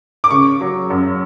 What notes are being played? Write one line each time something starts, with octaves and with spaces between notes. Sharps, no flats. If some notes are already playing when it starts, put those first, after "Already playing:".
D6
C#3 C#6
F#3
F#2